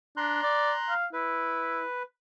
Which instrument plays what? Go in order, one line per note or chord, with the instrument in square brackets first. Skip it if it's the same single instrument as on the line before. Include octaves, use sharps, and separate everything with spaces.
[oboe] D4 [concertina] A#5 C6 F#6
[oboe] D5
F5
[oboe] E4 [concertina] B4